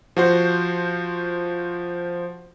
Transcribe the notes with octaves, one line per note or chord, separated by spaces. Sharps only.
F3 F#4 C5